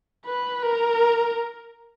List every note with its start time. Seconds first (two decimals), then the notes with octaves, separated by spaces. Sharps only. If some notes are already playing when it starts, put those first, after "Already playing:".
0.25 B4
0.63 A#4